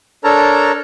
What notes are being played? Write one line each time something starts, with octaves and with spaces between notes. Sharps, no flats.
D4 A4 A#4 C#5 A5 A#5